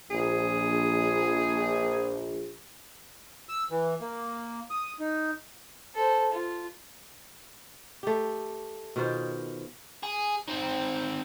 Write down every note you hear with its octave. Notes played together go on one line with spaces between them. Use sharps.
A#1 G#4
E6
E3
A#3
D#6
D#4
A4 C5
F4
A3 G4
B2 D#3 F4 C5
G#4
D#3 C4